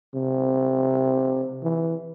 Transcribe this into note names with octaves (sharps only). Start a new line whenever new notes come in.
C3
E3